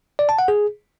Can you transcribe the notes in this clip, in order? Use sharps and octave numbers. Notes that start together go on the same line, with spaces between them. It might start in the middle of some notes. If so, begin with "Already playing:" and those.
D5
A5
F#5
G#4